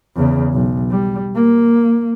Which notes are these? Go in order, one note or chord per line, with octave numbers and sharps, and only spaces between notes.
E2 C#3
B1
G3
A#3